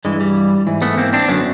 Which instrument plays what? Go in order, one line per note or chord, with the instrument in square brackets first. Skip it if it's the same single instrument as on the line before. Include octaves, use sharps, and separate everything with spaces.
[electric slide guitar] G2 E3 G#3
G3
G#2 E3
A3 B3
A#3 C4
C4 D4
F#2 D3 F#3 B3 C#4